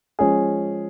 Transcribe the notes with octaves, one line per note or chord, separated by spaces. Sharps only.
F3 G#3 C#4 G#4